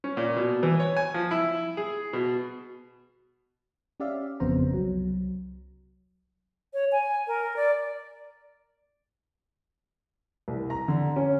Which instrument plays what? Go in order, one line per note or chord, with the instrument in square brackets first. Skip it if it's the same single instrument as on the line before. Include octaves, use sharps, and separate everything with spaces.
[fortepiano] C#4
A#2
B2
E3
C#5
G#5
F3
E4
G#4
B2
[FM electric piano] C#4 G4 D5 E5 F5
G1 F2 C#3 B3 C5 A#5
C2 F#3
[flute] C#5
G#5
A#4
D5
[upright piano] C2
A#5
D3
C#4